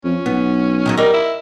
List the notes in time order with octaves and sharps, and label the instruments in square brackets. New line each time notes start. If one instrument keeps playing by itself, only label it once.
[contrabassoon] F2 [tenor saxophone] C#4
[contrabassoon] B1 [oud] B3
[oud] D#3 F3 F#3
[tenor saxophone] G3 [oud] A#4 D#5
[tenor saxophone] E4